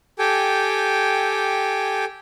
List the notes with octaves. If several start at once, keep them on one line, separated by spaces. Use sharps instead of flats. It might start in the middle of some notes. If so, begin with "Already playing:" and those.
G4 A4 G5 G#5